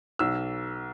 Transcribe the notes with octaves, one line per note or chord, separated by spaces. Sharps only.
B1 E6